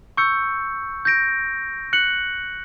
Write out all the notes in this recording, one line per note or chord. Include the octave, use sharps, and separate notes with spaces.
C#6 E6 G6 C#7
G6 A#6 D7
F#6 C#7 F#7